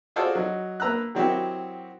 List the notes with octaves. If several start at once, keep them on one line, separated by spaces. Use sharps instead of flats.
F4 F#4 G#4 A4 C5 D5
F#3 D#4
A#3 B4 A#5 E6 F#6
D#3 F#3 C4 E4 F#4 G4